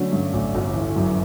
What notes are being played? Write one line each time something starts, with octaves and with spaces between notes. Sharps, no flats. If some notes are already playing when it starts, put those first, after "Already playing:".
Already playing: D3 F#3 A3 C#4
G2
A1
G1
E3
F#2